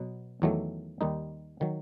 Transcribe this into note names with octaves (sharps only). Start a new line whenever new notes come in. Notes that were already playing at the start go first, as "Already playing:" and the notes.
Already playing: B2 F#3 B3
E2 D#3 F#3 A3
D#2 D#3 G3 D#4
D#3 F#3